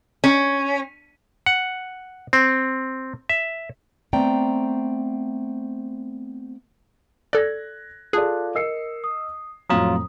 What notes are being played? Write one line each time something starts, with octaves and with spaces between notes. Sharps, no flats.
C#4
F#5
C4
E5
A3 B3 C4 D5 G5 A#5
A4 D5 F#6 G#6 A#6
F4 G#4 A4 D5 A5 F#6
A#4 D#5 E6 C7 C#7
D#6
F2 A2 F#3 F4 A#5 D#6